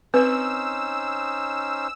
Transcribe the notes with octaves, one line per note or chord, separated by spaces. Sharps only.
C4 C#4 D#4 B4 C5 E6